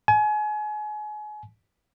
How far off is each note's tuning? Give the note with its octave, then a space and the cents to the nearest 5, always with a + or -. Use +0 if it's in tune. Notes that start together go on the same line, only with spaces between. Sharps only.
G#5 +30